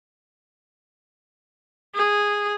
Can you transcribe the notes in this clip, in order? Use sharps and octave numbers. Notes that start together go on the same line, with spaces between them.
G#4